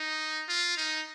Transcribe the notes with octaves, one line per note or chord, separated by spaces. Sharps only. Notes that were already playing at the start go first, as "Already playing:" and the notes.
Already playing: D#4
F4
D#4